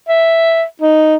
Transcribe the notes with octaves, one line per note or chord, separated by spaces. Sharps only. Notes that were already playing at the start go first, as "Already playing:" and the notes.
E5
D#4